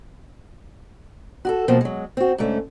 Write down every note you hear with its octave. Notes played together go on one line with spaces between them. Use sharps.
F#4 G4 A4
B2 F3 F#3 A#3 C4
F#3 G#3
C4 F#4
G#2 D3 A3 C#4